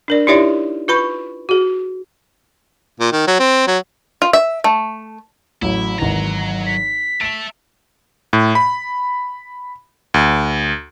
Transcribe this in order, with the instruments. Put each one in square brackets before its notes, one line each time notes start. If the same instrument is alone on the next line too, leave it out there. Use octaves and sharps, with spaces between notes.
[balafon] D4 A#4 D5
D#4 E4 G4 C#5 D5 E5
F4 B4 B5 C#6
F#4 G#4
[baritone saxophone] A#2
D#3
F#3
C4
F#3
[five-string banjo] F4
E5
A3
[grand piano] A1 F#3 [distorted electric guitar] E4
[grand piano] G#1 E3 [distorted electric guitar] F#3 A#5
[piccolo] B6
[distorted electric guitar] E5 A5 [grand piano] D7 E7
[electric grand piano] A2
B5
D2